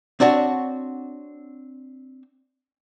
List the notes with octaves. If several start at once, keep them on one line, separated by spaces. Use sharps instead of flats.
C4 D4 F#4 C#5